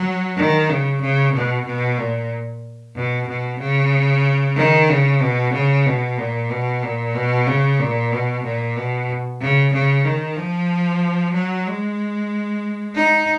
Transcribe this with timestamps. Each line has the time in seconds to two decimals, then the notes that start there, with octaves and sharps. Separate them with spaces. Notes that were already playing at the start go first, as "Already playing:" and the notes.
Already playing: F#3
0.37 D#3
0.69 C#3
1.02 C#3
1.33 B2
1.66 B2
1.98 A#2
2.95 B2
3.27 B2
3.59 C#3
4.56 D#3
4.89 C#3
5.21 B2
5.53 C#3
5.86 B2
6.18 A#2
6.50 B2
6.82 A#2
7.15 B2
7.46 C#3
7.79 A#2
8.12 B2
8.44 A#2
8.76 B2
9.41 C#3
9.73 C#3
10.05 D#3
10.37 F3
11.34 F#3
11.66 G#3
12.95 D#4